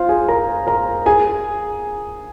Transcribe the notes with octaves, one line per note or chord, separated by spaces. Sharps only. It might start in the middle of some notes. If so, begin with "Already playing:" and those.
Already playing: F4 C5 F5
G#4 G#5
A#4 A#5
A#4 A#5
G#4 G#5